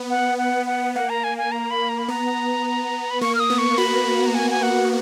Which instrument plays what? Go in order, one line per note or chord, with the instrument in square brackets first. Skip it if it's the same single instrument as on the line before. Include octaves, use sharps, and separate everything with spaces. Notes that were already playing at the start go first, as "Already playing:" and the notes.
Already playing: [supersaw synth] B3
[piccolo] F#5
F#5
F#5
[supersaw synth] A#3 [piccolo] F#5
[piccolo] A#5
G#5
G#5
A#5
B5
A#5
B5
[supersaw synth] B3 [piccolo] A#5
[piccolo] B5
[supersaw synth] A#3 [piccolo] C#6
[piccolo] F6
D#6
[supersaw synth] B3
[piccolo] C#6
[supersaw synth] F#4 [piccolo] B5
[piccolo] A#5
G#5
G#5
F#5